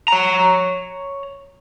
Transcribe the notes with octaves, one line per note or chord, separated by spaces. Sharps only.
C#5 A#5